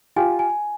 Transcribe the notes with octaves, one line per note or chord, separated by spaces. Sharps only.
F4 G4 G#5
G#5